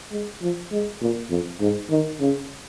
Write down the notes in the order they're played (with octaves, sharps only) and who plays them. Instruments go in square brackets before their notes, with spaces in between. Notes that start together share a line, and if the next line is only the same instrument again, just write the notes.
[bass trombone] G#3
F3
G#3
A#2
F2
G#2
D#3
C#3